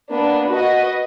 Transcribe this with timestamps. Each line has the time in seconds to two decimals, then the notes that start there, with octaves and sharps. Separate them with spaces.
0.10 A#3 B3 D4 B4
0.50 F#4 B4 D#5